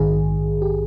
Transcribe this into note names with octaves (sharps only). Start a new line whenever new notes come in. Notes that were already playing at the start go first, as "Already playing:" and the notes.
Already playing: A#1 G#2 D#3 G#4
G4